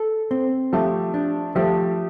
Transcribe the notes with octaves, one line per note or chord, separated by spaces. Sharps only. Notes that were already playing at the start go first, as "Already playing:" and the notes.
Already playing: A4
C4
F3 A3 G4
D4
F3 A3 G4